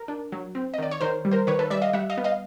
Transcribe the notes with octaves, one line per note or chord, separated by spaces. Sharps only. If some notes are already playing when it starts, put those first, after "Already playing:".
Already playing: A#4
D4
F#3
C4
D#5
D#3 D5
C#5
D#3 A#4 C5
G3
A#4 C5
D#3 B4 C#5
A4 B4
G3 D5 E5
D#5 F5
G3 E5 F#5
D#5 F5
B3
D#5 F5